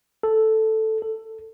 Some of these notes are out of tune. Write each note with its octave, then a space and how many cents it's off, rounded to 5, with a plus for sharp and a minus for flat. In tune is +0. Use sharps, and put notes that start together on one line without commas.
A4 +0
A4 +15